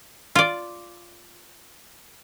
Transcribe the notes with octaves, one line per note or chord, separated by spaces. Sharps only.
F4 D5